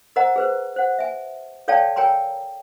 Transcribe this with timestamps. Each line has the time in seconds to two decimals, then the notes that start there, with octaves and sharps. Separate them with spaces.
0.16 A#4 C5 D#5 F#5 A#5
0.36 G#4 B4 C5
0.76 C5 F#5
0.99 E5 G#5
1.68 A4 C#5 D5 F5 G5 A5
1.96 A#4 C#5 G5 G#5 A#5 C6